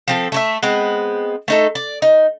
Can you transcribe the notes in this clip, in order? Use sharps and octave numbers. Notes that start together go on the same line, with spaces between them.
F3 C4 A4
A3 C#5 E5
G#3 B3 C4
A3 D#4 A4
D5
D#4